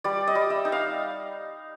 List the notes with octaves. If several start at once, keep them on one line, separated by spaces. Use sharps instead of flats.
G3 D5
D#5
G3
E5
D#4
F5